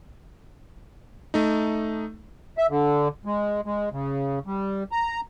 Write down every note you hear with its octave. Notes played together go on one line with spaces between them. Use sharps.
A3 D#4
E5
D3
G#3
G#3
C#3
G3
A#5